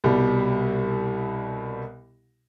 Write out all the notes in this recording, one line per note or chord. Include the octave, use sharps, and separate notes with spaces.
C2 B2 G3